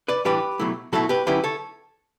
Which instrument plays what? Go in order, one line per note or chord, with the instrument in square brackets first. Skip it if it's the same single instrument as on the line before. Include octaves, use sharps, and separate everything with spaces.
[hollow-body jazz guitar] B4 D5
A2 E3 G3 D4 G4 B4
B2 F#3 A3 E4
B2 F#3 A3 E4 F#4 A4
G4 B4
D3 F#3 C#4 E4 G4 B4
A4 C#5